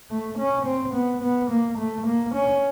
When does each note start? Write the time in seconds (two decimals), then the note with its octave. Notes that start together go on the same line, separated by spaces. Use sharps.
0.10 A3
0.38 C#4
0.66 C4
0.94 B3
1.22 B3
1.50 A#3
1.78 A3
2.06 A#3
2.34 C#4